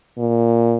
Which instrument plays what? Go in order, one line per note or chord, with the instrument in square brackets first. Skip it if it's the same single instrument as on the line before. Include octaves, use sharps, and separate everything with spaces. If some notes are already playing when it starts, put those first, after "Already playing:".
[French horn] A#2